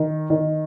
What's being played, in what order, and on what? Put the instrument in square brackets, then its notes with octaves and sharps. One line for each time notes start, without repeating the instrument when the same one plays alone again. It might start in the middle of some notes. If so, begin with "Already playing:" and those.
Already playing: [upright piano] D#3
D#3